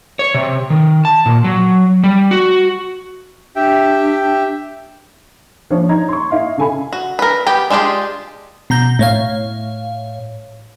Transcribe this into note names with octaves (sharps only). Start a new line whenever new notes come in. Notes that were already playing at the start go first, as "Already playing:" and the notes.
C#5
C3
D#3
A5
A#2
F#3
G3
F#4
D4 G4 E5 G5
F3 D4 C#5
D#4 A#5 G#6
C6 C#6
E4 D#5 F5
C#3 A4 G#5 B5
F#4
A#4 B4
B3 G4 G5
G#3 D4 F4 G4 G#4
B2 A#5 G6
A2 C#5 F5